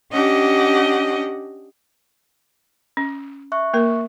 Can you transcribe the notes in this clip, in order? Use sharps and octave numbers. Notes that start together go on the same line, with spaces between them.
C#4 D4 G4 D#5 F#5
C#4
E5 C#6 F#6
A#3 A#4